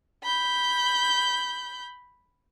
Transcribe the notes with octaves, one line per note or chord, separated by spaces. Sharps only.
B5 G6